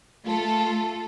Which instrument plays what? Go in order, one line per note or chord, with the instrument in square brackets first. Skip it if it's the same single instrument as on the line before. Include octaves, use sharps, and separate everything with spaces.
[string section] A3 F4 A4